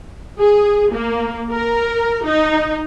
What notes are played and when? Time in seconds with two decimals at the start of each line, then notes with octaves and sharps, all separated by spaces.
0.40 G#4
0.94 A#3
1.51 A#4
2.25 D#4